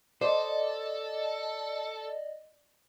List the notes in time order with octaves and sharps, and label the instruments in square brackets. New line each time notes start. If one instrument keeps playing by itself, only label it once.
[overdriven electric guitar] A4 [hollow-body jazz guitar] C5 [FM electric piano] D5 D#5